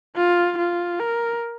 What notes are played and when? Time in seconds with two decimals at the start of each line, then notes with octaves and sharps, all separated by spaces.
0.16 F4
0.59 F4
1.00 A#4